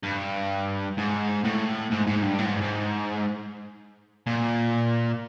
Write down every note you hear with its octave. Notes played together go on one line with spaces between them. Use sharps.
G2
G#2
A2
G#2
G#2
G2
A2
G#2
G2
G#2
A#2